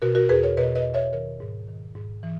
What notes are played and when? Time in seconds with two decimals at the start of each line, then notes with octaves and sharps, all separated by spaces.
0.02 B2 F#4 A#4
0.15 F#4 A#4
0.29 E2 G#4 B4
0.43 A#4 C#5
0.57 B2 B4 D#5
0.75 B4 D#5
0.85 E2
0.94 C#5 E5
1.13 D#3 A#4 C#5
1.40 G#2
1.68 D#3
1.95 G#2
2.23 E3